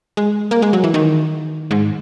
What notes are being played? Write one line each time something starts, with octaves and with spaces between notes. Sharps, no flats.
G#3
A#3
G#3
F#3
E3
D#3
G#2